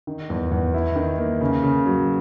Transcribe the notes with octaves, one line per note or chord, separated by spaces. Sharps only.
D#3
E2
E2
E4
D#3
A#3
C#3
C#3
F#3